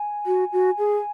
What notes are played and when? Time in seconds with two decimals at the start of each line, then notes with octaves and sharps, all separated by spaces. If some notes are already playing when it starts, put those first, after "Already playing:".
Already playing: G#5
0.26 F#4
0.53 F#4
0.78 G#4